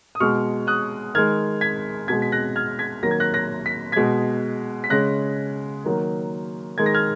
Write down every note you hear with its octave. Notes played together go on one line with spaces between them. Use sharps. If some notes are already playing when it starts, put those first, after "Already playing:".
D#6
B2 G#3 C#6 F6
D#6 F#6
D#3 G#3 F6 G#6
G#6 B6
B2 G#3 G#6 B6
B6
F#6 A#6
F6 G#6
G#6 B6
D#3 F#3 A#3 A#6
G#6
F#6 A#6
F#6 A#6
B6
B2 G#3 G#6 B6
B6
C#3 G#3 F#6 A#6
D#3 F#3 A#3
D#3 G#3 G#6
A#6
F6 G#6